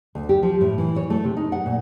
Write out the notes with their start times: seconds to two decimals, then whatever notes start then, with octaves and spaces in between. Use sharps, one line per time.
0.15 D2
0.29 G4
0.43 F3
0.61 A2
0.78 E3
0.96 C#5
1.10 A3
1.24 C3
1.37 D#4
1.52 F#5
1.66 A#2